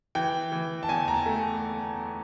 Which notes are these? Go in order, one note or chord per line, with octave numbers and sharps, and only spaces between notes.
E3 G5
E3
A5
E2 G#5
A#5
A5
A3